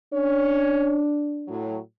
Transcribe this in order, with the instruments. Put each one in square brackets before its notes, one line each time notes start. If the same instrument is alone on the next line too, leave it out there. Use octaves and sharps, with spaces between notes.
[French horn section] C#4 C#5 [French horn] D4
[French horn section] A2 F#3